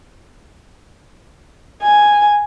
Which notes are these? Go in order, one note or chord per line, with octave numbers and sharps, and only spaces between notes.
G#5